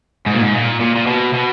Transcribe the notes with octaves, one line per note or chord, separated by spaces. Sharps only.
G#2
A#2
G#2
A#2
A#2
A#2
B2
B2